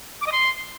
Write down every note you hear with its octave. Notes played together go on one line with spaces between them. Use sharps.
D6
D#5
C6